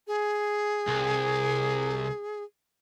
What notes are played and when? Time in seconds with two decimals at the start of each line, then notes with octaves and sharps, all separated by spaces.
0.07 G#4
0.88 C2